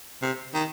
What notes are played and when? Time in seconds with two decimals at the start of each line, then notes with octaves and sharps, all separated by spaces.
0.22 C3
0.54 D#3